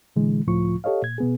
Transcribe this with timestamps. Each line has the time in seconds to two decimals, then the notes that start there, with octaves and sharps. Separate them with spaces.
0.16 A#2 D3 E3 G#3
0.47 C#2 A2 F3 F4 C#6
0.84 G4 A4 C#5 D#5 F5
1.02 A#2 G#6
1.18 B2 B3 G#4